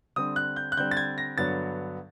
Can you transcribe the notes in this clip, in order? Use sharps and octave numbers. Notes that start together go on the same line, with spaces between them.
D3 G3 C4 D#6
F#6
G6
F#6
D3 G3 C4 G6
A6
G#6
A#6
G2 D3 F#3 B3 A6